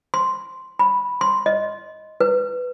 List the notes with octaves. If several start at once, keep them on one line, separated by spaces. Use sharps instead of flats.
C6
B5
C6
D#5
B4